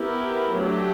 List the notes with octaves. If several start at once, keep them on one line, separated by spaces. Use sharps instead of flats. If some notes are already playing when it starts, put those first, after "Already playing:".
Already playing: B3 E4 G4 A#4
F#3 A3 D4 G4